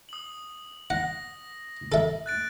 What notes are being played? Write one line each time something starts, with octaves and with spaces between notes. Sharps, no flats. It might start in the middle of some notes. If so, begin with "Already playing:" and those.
D#6 F#7
F#5 A#6
A4 E5
F#6 A6 D7